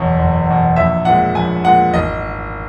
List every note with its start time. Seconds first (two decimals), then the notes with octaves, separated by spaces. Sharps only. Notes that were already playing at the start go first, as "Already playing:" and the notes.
Already playing: F#1 E2 B2 C#5
0.18 F#1
0.47 E2 B2
0.76 A#1 E5
1.05 A#2 G#3 F#5
1.35 A#1 G#5
1.64 A#2 G#3 F#5
1.94 G#1 D#5